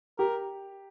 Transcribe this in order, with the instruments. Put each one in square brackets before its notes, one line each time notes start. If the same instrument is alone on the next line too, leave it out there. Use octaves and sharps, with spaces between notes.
[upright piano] G4 [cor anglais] A#4